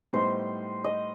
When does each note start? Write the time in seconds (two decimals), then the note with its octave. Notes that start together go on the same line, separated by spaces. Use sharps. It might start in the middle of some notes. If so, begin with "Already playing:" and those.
0.13 A2 G3 B3 D#4 C5
0.84 D#5